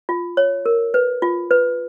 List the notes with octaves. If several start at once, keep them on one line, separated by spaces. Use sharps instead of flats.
F4
C#5
A#4
B4
F4
B4